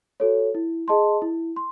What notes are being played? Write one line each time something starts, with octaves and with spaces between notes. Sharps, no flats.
F#4 A4 C#5
E4
G#4 D#5 A5 C6
E4
C6